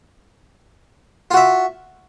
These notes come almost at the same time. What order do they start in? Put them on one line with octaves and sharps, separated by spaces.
F4 F#4 E5